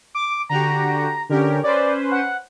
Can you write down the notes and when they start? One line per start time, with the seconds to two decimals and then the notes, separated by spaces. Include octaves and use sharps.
0.15 D6
0.49 D3 F#4 G4 A#5
1.29 D3 C#4 G4 A#4
1.64 C#4 B4 C5 D5
2.12 F#5